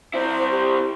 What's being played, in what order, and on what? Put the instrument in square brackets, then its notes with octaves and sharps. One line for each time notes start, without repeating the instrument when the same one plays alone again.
[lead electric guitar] C4 E4 [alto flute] C5
[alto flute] G4